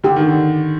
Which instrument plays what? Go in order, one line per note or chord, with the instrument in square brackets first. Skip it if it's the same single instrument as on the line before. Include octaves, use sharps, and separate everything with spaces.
[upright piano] D3 [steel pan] G4
[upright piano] D#3
D3